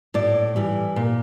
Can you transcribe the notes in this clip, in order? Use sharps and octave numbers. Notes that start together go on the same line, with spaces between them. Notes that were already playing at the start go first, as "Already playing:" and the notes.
A2 D5
E3 G3
A#2